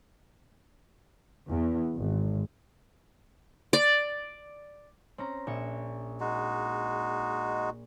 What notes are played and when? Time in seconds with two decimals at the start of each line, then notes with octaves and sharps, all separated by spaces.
1.49 E2
1.93 G#1
3.73 D5
5.18 C4 C#4 A#5
5.47 A#1 E5 C#7
6.20 G#3 D#4 F#4